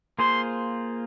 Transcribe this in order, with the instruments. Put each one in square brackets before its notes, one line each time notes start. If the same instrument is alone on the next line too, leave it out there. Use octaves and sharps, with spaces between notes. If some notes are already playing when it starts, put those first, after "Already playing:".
[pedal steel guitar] A#3 F4 G#4 C5 [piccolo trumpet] C6